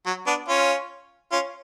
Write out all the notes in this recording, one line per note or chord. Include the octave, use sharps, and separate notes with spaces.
F#3
B3 D4
C#4 F4
C#4 F4